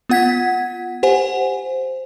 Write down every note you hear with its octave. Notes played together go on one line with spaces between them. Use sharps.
B3 F4 F#5 G#6 B6
G4 C5 F#5 G#5